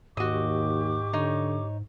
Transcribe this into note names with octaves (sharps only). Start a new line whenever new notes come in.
D#2 G#2 F#4 G4 D#5 C#6 D6
D3 D#4 C#5